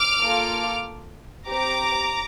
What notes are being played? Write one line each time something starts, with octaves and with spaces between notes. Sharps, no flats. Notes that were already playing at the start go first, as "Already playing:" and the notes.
Already playing: D6 F6
A#3 F4 A4
C4 G4 A#5 D6